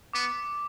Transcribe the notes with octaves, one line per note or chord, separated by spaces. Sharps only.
B3 D6